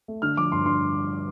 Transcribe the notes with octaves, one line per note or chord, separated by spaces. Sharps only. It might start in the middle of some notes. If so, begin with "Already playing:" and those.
A3
D3 F6
F3 D6
G2 C6
D3 C6